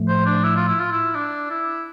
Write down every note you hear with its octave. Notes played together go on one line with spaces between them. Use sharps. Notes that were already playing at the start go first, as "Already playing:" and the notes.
Already playing: A2 F3 A3
C5
D4
E4
F4
E4
F4
E4
D4
E4